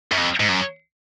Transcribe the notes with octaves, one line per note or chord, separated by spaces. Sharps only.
F#2
F2
G#2
F#2